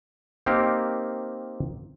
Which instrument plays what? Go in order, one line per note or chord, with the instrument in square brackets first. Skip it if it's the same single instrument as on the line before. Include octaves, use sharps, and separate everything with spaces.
[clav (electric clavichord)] A#3 C4 D#4 G4 A#4